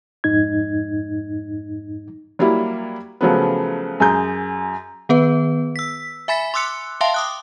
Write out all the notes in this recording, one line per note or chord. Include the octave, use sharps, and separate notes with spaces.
F2 G#2 D#4 G#6
F#3 G3 A#3 E4
C#3 F3 F#3 A3 B3
F#2 G#4 A#5 G6
D#3 B3 B4
E6 B6
E5 G#5 B5 A6 B6
C6 D6 E6 F#6 C#7
E5 F5 G5 A5 C6
D6 D#6 F#6